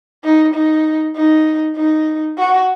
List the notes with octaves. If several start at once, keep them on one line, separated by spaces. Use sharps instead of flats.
D#4
D#4
D#4
D#4
F#4